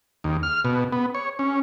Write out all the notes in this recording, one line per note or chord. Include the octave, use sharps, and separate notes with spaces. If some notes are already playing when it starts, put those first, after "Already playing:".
D#2
F6
B2
B3
C#5
C#4